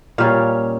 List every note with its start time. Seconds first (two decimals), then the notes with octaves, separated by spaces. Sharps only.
0.18 A#2 G3 C#4 F5